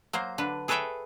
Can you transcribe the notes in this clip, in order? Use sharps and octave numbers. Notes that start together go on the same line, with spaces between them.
F#3 A#3 C5
D3 D4 B4
G#4 A4 B4 C#5 E5 G5